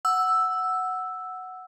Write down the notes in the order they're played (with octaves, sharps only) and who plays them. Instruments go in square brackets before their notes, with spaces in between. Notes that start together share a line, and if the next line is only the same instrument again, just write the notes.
[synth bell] F#5 E6